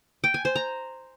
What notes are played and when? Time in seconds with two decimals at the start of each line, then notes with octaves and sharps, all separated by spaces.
0.24 G5
0.34 G#5
0.45 C5
0.56 A#5